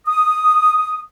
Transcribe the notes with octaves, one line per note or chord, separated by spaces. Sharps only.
D#6